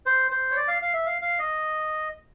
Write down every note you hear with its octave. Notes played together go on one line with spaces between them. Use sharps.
C5
C5
C#5
D5
F5
F5
E5
F5
F5
D#5